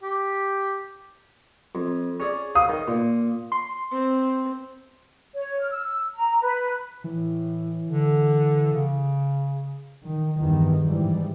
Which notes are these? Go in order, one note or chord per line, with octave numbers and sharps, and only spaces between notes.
G4
F2
C#4 G#4 D5
F5 D#6
D#3
A#2
C6
C4
C#5
F6
E6
A#5
B4
A2 E3
D3
C#3
D#3
E2 G2 D#3 E3
G#2 E3 G3